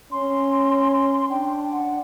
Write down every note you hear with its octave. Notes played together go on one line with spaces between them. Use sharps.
C#4 C6
D4 G5
F#5